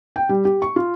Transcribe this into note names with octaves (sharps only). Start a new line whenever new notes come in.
G5
G3
G4
C#6
F4